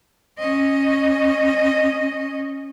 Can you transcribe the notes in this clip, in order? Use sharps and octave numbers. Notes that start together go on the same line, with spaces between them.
C#4 D#5